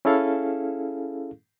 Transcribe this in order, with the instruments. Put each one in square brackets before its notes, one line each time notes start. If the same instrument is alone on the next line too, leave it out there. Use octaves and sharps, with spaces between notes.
[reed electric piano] C#4 E4 G#4 A4 F5